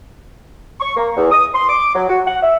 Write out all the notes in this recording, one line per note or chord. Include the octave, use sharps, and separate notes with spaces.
C#6
A#3
E2
D#6
C6
D6
F#3
F#4
F#5
E5